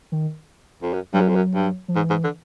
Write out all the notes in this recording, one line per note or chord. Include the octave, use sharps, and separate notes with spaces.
D#3
F2
F#2
G2 F#3
F#2
F2
F#2
G2
F3
G#2 E3
G#2
D3